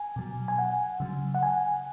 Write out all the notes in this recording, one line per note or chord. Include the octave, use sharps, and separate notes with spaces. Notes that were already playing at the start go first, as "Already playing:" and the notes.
Already playing: G#5
B2 F#3
G#5
F#5
C#3 F#3
F#5
G#5